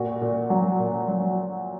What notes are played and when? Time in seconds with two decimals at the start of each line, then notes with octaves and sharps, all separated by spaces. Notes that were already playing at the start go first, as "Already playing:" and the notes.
Already playing: A#2 F#4
0.21 A#2
0.50 F#3
0.80 A#2
1.08 F#3